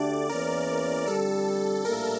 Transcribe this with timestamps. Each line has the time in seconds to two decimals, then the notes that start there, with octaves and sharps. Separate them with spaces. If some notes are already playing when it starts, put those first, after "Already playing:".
Already playing: D2 D3 A3 D4 G4 D5
0.29 E2 E3 A#3 C#4 A#4
1.08 F2 D3 G3 A4
1.84 A#1 A2 G3 A#3 E4 A#4